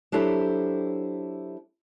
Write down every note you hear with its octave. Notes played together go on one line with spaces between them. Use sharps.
F#3 D4 E4 G4 A4 C5